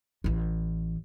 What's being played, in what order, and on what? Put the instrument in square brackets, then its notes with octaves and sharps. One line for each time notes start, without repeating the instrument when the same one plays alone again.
[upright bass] A1 E3